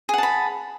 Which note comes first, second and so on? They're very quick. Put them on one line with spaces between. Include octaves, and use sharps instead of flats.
G#4 F#5 A5 B5